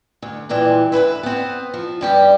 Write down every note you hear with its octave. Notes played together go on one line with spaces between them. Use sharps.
D2
F2 A#2 E3 G3
D2 G2 B4 E5
B3 C4
F3
G2 G3 G4